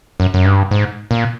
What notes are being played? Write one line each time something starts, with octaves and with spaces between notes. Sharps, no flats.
F#2
F#2
G2
G#2
A#2